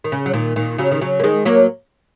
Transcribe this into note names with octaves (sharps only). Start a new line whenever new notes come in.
D#3
C#3
F#3
A#2 D#3
A#2 D#3
C#3 F#3
D#3
C#3 F#3
A#3
D#3 G#3
F#3 A#3